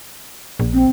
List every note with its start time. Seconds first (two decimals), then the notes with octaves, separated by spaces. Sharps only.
0.59 A#1
0.73 C4